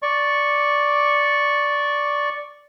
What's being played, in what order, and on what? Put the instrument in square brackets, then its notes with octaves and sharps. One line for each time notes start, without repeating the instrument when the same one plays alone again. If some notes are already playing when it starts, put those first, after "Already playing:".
[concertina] D5 C#6